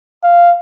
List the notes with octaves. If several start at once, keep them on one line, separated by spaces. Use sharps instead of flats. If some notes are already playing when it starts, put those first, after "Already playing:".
F5